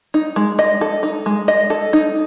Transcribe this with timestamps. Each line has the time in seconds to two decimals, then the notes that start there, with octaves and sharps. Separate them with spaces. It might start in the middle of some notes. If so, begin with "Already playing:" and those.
0.14 D#4
0.36 G#3
0.59 D#5
0.81 A4
1.03 D#4
1.26 G#3
1.48 D#5
1.70 A4
1.93 D#4